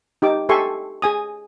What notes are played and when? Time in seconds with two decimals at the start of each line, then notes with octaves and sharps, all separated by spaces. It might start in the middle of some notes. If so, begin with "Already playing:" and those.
0.22 D#4 G4 D6
0.49 G4 A4 E5 G#5 C6 C#6
1.02 G#4 G#5 D#6